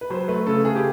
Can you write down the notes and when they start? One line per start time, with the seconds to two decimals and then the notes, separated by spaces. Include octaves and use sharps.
0.01 B4
0.10 F#3 C5
0.28 A3 B4
0.46 C#3 A4
0.64 C#3 G#4
0.75 G4